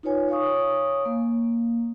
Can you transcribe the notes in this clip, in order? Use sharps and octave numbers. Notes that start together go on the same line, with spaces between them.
D#4 F4 B4 C#5 G#5
C#5 F5 G#5 C#6 D#6
A#3